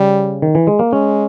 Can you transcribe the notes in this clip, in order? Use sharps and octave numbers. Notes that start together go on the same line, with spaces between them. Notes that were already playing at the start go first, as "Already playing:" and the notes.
Already playing: C#3 G3
D#3
E3
G#3
A#3
G#3 C#4